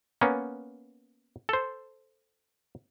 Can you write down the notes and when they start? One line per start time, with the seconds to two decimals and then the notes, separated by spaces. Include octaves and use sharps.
0.21 A#3 B3 C#4
1.49 A4 C5